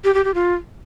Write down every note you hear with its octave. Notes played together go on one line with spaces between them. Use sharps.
G4
G4
G4
F4